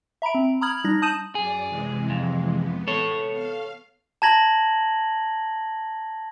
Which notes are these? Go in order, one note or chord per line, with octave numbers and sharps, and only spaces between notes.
E5 A#5 B5 D7
C4
A#5 B5 D#6 F6 G#6 F#7
G3 D4 D#4 A#6
A5 D#6 G6 D#7 E7 F#7
F#2 G#4 D5
C3 E3 G#3
F2
B3
A4 C#5
F5
A5 A#5 G#6 A#6 F#7